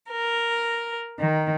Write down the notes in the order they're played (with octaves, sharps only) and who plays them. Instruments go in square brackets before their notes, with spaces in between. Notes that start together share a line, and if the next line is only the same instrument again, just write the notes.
[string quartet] A#4
D#3